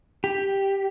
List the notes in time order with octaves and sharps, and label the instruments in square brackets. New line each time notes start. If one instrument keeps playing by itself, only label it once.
[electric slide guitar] G4